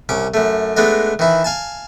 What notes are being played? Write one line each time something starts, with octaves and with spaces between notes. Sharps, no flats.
C2 C#4 D6
F#2 A3
G#3 A3 B3 D4 D#5
D#3 E3 E4
F5 G#5 A5